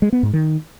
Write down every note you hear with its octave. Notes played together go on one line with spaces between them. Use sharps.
G#3
B3
G#2
D#3